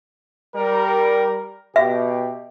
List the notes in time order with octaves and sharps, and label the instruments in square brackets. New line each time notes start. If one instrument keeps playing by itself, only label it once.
[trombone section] G3 A#4
[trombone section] B2 G4 [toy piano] E5